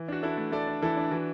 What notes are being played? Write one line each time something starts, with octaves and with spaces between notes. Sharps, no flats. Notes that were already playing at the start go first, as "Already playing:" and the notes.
Already playing: E3
D4 F#4
D4 E4 A4
A3
A3 A4 D5
D4
E3 E4 A4
D4
E3 F#4